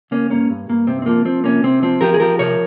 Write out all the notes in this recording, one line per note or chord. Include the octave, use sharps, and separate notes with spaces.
C#3 A#3 C#4
G2 A#3 C#4
G2
G2 A#3
C3 C4
C4
F3 A#3
F3 C4
C3 A#3 C#4
C3 C4
F3 C4
F3 G4 A#4
G#4
F3 G4 A#4
C3 A#4 C#5